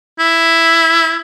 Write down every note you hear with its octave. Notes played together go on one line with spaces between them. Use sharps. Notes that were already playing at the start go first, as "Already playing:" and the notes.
E4